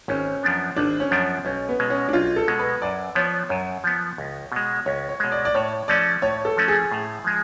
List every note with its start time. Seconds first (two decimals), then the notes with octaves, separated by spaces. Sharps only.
0.08 G#1 C#4
0.43 F#2 F3 B3 D4
0.76 G#1 D4
1.00 C#4
1.11 F#2 F3 B3 D4
1.45 B1 C#4
1.69 B3
1.79 B2 G#3
1.90 C#4
2.08 D4
2.13 B1 F4
2.36 A4
2.48 B2 G#3
2.59 B4
2.82 F#2 D5
3.15 F3 B3 C#5
3.49 F#2 C#5
3.84 F3 B3
4.18 C#2
4.52 B2 G#3
4.86 C#2 C#5
5.09 C#5
5.20 B2 G#3
5.32 D5
5.45 D5
5.54 A2 C#5
5.88 F3 A3 C#4 D5
6.22 A2 C#5
6.45 A4
6.57 F3 A3 C#4
6.68 G#4
6.92 A2
7.24 F3 G#3